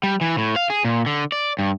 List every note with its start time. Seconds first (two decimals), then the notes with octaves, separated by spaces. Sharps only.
0.03 G3
0.21 E3
0.38 A2
0.56 F5
0.70 G#4
0.85 A#2
1.06 D3
1.32 D5
1.59 G2